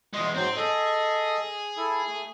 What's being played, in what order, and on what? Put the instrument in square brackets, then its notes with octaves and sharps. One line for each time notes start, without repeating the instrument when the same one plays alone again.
[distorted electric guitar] E2 G#3 [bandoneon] D#5 C6 D#6
[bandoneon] G#2 F#3 C5 [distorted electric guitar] C4
[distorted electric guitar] G#4 [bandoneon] A4 D#5
[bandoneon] E4 A4
A3